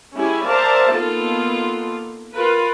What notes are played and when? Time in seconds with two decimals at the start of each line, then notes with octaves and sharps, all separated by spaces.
0.14 G#3 C#4 E4 G4 G#5
0.47 A#4 C5 D5 E5 F5 A5
0.93 A#3 B3 D#4 F4 A4
2.33 F4 A#4 B4